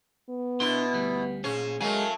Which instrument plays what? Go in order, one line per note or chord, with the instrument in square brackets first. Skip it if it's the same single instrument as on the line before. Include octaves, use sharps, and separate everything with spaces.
[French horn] B3
[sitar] B2 E4 [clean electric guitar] D4 C6
[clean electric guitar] D2 G3
[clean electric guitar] A#2 G#4 C5 [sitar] C#4
[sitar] F#3 A3 [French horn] G#3 [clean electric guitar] A#4 F5 G#5